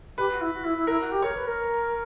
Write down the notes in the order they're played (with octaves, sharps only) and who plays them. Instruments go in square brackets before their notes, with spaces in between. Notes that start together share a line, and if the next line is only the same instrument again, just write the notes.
[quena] G4 [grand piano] B4
[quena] F#4
E4
F#4
E4
E4
[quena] E4 [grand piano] A#4
[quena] F#4
G4
[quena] A#4 [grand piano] C#5
[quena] B4
A#4